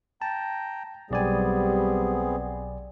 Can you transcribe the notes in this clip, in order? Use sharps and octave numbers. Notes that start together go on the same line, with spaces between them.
G5 A5 A#5
B1 G3 B3 C4 G#4 D5 G#5